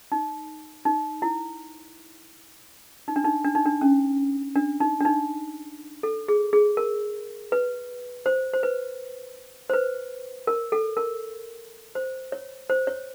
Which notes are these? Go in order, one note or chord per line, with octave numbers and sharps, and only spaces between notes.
D#4
D#4
E4
D#4
D4
D#4
D4
D#4
D4
C#4
D4
D#4
D4
D#4
A4
G#4
G#4
A#4
B4
C5
C5
B4
C5
B4
A#4
A4
A#4
C5
C#5
C5
C#5